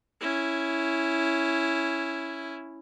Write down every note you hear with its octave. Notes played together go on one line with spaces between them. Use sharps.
C#4 E4